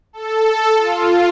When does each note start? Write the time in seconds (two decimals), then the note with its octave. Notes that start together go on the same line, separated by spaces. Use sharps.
0.13 A4
0.76 F4